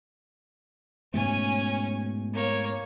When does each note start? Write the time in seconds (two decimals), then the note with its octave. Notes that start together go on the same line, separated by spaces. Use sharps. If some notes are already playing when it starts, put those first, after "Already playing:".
1.14 G#2 B2 A3 C#4 G#5
2.34 A#3 C#5